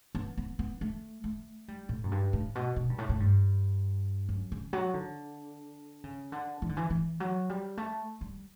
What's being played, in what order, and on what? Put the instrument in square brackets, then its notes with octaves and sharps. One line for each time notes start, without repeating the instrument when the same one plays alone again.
[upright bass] B3
B3
B3
A3
A3
G3
A2
F#2
G2
A2
B2
B2
G2
A2
A2
G2
F#2
C#3
F#3
D3
C#3
D3
E3
D3
E3
E3
F#3
G3
A3
G3